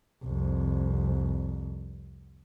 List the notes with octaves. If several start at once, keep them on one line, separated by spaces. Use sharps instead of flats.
C2 F2